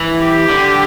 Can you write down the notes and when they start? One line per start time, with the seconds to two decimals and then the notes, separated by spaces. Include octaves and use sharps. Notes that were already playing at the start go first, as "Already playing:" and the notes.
Already playing: E3
0.20 G4
0.50 D3